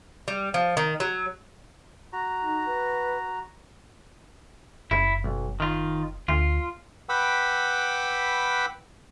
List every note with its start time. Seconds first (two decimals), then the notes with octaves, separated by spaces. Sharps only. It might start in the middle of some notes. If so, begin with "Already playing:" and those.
0.28 G3
0.54 F3
0.77 D#3
1.00 F#3
2.13 F#4 A#5
2.43 D#4
2.66 B4
4.91 F#1 E4
5.24 B1
5.60 D#3 F4
6.28 D2 F4
7.09 B4 F#5 G5 B5 D6 E6